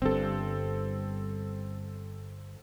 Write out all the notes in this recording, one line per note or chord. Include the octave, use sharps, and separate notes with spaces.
G1 G2 C4 A4